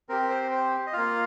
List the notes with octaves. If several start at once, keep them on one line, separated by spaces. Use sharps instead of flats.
C4 G4 A#4
C5
C5
D#5
A#3 F4 F5